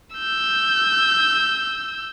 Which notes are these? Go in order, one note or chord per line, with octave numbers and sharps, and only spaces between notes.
E6 G6